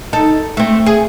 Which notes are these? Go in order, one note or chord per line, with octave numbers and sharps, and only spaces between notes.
D#4 A4
A3 C4
G#4